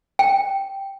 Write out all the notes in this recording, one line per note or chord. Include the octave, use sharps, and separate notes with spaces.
G5